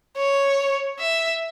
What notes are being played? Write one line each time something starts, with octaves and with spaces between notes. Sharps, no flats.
C#5
E5